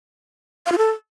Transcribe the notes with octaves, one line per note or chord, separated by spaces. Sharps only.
F5
F4
A4